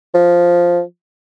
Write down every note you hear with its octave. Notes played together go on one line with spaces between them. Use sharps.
F3